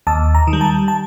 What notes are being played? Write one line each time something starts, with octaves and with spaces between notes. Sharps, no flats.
D#2 A5
A#5
D#3
G3
A5
A5